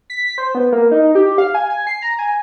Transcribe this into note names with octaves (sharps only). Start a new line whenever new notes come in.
B6
C5
B3
A#3
D#4
G4
F5
G#5
G#5
C7
A#5
G#5